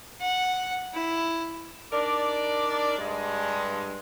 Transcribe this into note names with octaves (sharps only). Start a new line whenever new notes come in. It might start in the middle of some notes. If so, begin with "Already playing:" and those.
F#5
E4
D4 D#4 A#4 D5
G2 G#3